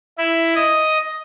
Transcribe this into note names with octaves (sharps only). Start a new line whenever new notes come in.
E4
D#5